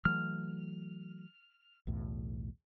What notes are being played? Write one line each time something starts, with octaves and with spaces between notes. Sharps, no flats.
E3 F#3 A3 F6
B1 E2 A2